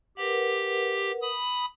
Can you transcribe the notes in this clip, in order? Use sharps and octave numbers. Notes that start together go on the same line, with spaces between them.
G4 A#4 B4 F#5
B5 D#6